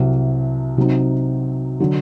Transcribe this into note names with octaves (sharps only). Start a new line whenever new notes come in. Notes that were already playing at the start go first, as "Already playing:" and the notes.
Already playing: C2 C3 F#3
C3 F#3 C4 D#4
D3 F#3